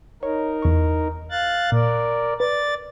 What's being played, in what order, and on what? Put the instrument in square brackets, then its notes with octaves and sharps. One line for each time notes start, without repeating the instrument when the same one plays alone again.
[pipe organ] D#4 A#4 [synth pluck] C#5
[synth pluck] E2 C#6
[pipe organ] F5 F#6 A6
[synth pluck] A#2 [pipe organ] A#4 D5
[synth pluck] B4 [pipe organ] D5 A6